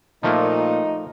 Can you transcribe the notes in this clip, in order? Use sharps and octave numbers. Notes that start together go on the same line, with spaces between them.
A#2 F3 A3 A#3 D#4